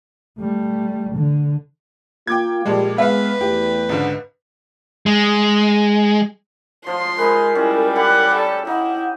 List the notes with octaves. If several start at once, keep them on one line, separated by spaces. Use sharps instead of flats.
G3 A3
D3
A#3 F4 G5 D6 G#6
A#2 F3 G3 G#3
G#3 B3 B4 E5 F5
E2 A3 G4
C#2 G#2 D3
G#3
F3 F4 C6
G#3 D#4 A#4 B4
G3 G#3 C#4 E4
E4 G4 F#5
A4 D5
D#4 E4 F#5